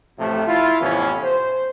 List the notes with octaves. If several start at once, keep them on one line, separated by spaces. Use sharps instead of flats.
A1 A2 C3 F3 A3
E4 F4
F2 A2 C3 E3 B3 C#4
C5